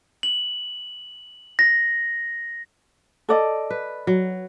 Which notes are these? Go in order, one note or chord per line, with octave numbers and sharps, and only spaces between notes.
F#7
A#6
A4 D5 D#5
B4
F#3